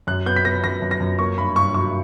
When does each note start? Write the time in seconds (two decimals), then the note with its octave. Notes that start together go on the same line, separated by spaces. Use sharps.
0.07 F#2 F#6
0.26 B3 G6
0.36 B6
0.45 B3 A#6
0.64 F#2 A#6
0.82 F#2
0.91 A#6
1.00 F#2
1.19 A#3 C#6
1.38 G2 B5
1.56 G2 C#6
1.74 F#3 C#6